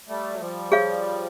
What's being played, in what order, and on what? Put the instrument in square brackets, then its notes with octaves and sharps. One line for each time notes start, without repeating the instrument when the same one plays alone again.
[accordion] G3 A3
F#3
F3 G3
[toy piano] G#4 C#5 F5